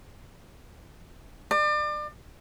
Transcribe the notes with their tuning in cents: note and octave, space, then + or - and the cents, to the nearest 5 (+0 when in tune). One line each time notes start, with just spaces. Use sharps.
D5 +35